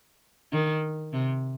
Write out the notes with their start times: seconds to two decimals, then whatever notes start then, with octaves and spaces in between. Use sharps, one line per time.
0.52 D#3
1.13 C3